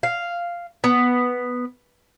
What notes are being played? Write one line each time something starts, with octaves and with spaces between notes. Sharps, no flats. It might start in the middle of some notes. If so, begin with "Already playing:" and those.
F5
B3